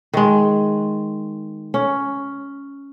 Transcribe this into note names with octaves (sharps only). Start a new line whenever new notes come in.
D#3 G#3
C#4